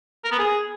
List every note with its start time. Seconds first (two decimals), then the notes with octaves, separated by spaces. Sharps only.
0.24 A#4
0.31 B3
0.38 G#4